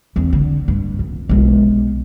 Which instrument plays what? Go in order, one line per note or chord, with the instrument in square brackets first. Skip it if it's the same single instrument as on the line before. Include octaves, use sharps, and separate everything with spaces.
[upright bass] E2 C4
D3
G2
F2
B1 G#3